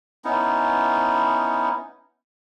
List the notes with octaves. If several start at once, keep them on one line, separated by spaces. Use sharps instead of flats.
B3 C#4 D#4 E4